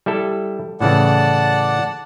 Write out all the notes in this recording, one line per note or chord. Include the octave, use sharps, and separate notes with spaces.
G3 E4 A4
A2 C#3 E3 D5 F#5 A5